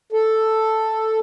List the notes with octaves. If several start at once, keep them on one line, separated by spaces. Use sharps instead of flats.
A4